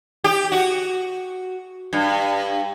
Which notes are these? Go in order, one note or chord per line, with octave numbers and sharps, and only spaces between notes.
G4
F#4
G2